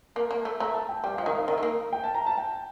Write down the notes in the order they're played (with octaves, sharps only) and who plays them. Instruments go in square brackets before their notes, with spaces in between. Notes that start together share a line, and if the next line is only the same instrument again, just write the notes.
[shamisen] A#3 [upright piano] A5
[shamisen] A#3
A3
[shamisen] A3 [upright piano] A#5
[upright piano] A5
G5
[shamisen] G3 [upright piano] G5
[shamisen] F3 [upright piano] F5
[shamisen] D#3 [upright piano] D#5
[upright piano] F5
[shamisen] D#3 [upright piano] D#5
[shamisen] A3
A#3
[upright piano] G5
A5
A#5
A5
G5